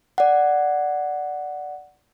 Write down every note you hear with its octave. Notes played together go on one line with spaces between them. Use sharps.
D5 F#5